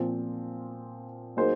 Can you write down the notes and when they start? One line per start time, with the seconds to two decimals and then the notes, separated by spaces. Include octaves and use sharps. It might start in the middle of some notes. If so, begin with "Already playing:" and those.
Already playing: A#2 F3 C4
1.37 F#3 A#3 D#4 G#4 C5